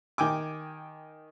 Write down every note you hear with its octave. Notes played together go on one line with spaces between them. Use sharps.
D#3 G5 G#5 D6